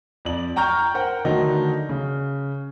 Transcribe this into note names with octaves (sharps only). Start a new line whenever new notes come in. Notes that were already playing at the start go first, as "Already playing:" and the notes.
F2 D5 F#7
G5 A#5 C#6 F6 G6
A#4 C5 F#5 G5
D3 D#3 F#3 A3 D4 D#4
C#3